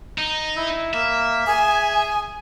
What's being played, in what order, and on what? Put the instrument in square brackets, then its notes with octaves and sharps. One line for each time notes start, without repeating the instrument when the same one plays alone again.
[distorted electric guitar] D#4
[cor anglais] E4
[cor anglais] A#3 [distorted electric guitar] E5
[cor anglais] G#4 [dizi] G#5